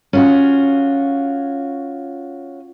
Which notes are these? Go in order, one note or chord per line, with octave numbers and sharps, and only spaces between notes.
C#4 F4 F#4